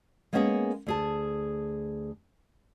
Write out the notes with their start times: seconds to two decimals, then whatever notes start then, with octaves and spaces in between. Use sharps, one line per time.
0.33 G#3 A#3 B3 C#4 F#4 G#4
0.86 D2 G#4 A5